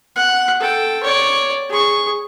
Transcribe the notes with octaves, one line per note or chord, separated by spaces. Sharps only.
F#5
A4 G5
C#5 D5
G#4 C#6